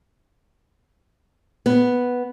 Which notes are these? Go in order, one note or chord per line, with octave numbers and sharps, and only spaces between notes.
B3